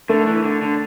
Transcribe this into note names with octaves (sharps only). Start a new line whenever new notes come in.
D3 A3
E3
D3
D3